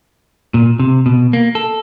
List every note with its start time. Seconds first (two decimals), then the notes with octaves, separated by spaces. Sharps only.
0.54 A#2
0.79 C3
1.06 B2
1.33 A#3
1.55 A4